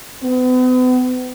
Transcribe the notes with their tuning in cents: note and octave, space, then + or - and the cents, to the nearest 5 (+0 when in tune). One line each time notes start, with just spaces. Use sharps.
B3 +40